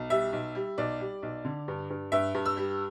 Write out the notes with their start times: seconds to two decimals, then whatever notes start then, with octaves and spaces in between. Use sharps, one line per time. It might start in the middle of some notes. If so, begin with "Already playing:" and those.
Already playing: B1
0.10 G3 E5
0.33 B1
0.55 G3
0.78 B1 D5
1.00 G3
1.23 B1
1.45 D3
1.68 G2
1.90 G2
2.12 G2 E5
2.35 G2
2.46 E6
2.57 G3